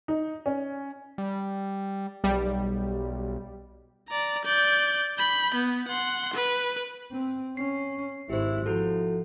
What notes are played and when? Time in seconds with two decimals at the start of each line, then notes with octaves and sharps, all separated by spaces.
0.08 D#4
0.46 C#4
1.18 G3
2.24 B1 G3
4.08 D5 A#5
4.45 D5 G6
5.18 B5 G6
5.55 B3
5.88 F#5 C6
6.34 B4
7.12 C4
7.57 C#4 C7
8.30 G#1 E4 G4 C5
8.66 F3 E4 F#4 A4